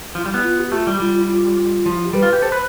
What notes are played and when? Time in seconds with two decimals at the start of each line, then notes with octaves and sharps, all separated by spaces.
0.15 F3 E4
0.26 G3
0.34 B3
0.44 F4
0.58 G4
0.72 A3 F4
0.86 G3 E4
1.00 G3 F4
1.10 F4
1.20 E4
1.29 F4
1.86 F3 E4
1.95 F4
2.04 G4
2.13 G3 B4
2.23 F4
2.33 G4
2.42 A4 C5
2.52 B4